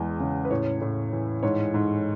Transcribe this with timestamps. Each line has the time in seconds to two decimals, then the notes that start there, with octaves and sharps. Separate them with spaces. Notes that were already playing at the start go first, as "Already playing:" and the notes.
Already playing: E2 G#3
0.20 C#3
0.45 B4
0.51 A2 C#5
0.81 A2
1.12 E3
1.43 G#2 C#5
1.74 G#2